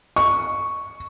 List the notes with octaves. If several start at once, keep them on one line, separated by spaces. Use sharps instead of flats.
C#6